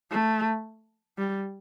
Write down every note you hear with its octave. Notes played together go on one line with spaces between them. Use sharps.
A3
G3